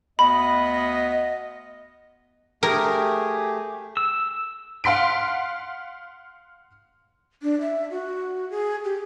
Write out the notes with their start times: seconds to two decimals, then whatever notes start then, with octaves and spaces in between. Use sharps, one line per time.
0.19 D2 B3 D#5 B5
2.63 A3 G4 G#4 A#4
3.97 E6
4.84 F5 F#5 C6 B6 D7
7.43 D4
7.61 E5
7.91 F#4
8.50 G#4
8.84 G4